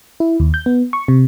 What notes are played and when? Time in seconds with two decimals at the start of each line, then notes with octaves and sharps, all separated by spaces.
0.20 E4
0.40 D#2
0.54 G6
0.66 B3
0.93 C#6
1.08 C3